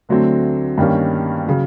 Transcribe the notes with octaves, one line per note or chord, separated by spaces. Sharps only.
D2 D3 F#3 A3 C4
G2 D#3 G3 A#3 C#4
C#3 F#3